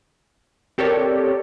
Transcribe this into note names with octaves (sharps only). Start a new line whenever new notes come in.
C4 G4 A4 A#4 C#5 D5